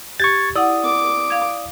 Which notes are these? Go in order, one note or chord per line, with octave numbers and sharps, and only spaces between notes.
G4 C#6 G#6 A6
E4 D5 F#5 D#6
D6
F5 G#6